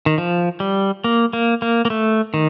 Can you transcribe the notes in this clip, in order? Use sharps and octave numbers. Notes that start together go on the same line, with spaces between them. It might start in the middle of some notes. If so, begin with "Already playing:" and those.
D#3
F3
G3
A#3
A#3
A#3
A#3
A3
D#3